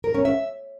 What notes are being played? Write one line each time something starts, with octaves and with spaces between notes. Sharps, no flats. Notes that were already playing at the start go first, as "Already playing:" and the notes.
A#4
C#4
E5